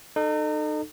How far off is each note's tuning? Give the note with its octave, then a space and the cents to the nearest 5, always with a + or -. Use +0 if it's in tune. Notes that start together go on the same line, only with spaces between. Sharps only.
D#4 -35 A4 +0